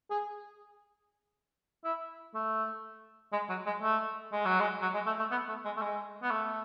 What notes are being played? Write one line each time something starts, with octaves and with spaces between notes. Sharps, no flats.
G#4
E4
A3
G#3
F#3
G#3
A3
G#3
F#3
G#3
F#3
G#3
A3
A3
B3
A3
G#3
A3
G#3
B3
A3